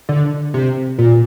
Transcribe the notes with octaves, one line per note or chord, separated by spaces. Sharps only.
D3
C3
A#2